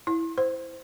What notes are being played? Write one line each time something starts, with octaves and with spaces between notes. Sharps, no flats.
E4
C5